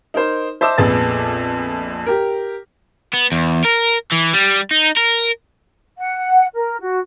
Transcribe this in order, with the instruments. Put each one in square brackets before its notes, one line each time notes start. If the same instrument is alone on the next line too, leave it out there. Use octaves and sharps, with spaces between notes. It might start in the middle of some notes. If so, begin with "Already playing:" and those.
[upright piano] D#4 A#4 C5
C5 D#5 E5 A5 D6 E6
A#1 F2 B3 G#4 B4 A6
G4 A#4
[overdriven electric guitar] B3
E2
A#4
E3
G3
D#4
A#4
[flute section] F#5
A#4
F#4